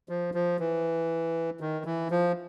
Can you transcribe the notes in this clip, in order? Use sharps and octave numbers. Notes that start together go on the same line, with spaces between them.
F3
F3
E3
D#3
E3
F3